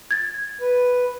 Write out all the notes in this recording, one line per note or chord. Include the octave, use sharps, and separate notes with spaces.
G#6 A6
B4